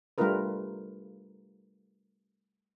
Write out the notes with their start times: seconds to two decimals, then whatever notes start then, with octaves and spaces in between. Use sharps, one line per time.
0.18 G3 A3 D4 F4 A#4 B4